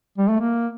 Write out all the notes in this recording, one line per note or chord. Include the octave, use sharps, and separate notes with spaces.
G3
A3
A#3